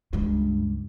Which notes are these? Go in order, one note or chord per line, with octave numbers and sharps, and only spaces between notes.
C#2 G2